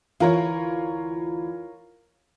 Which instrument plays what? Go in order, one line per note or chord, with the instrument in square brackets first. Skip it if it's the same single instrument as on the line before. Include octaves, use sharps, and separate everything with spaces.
[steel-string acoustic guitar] D2 E3 [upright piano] F4 A#4 C#5